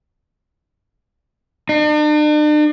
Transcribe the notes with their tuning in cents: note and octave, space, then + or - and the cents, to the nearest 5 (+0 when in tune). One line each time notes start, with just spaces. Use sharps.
D4 +45